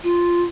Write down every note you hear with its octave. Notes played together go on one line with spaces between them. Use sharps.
F4